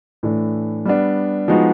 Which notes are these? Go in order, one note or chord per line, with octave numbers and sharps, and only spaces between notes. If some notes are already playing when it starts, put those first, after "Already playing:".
A2 E3 A3 D4
G3 B3 D4
F3 G#3 B3 D#4 F#4